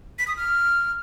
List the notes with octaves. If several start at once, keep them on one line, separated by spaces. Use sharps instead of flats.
B6
D#6
F6